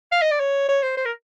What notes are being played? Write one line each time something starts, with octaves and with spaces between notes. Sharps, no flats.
F5
D#5
D5
C#5
C#5
C5
C5
A#4